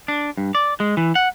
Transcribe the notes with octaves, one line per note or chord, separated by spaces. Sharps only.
D4
G2
D5
G#3
E3
F#5